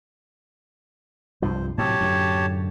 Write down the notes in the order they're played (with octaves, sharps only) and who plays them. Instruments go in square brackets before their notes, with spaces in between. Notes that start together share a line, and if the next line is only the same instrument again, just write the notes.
[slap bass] C2 G2 F3 [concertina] C5
[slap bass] A2 C3 F#3 [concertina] G4 C#5 A5
[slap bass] F#2 A2 D3